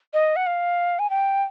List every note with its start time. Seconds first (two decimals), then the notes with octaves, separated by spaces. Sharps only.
0.14 D#5
0.36 F#5
0.47 F5
0.99 G#5
1.10 G5